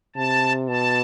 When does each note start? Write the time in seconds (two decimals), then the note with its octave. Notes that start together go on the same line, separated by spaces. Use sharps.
0.16 C3 A5
0.68 B2 A5